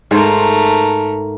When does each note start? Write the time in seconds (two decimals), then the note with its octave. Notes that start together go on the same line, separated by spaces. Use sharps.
0.11 G#2 A3 A#4 C5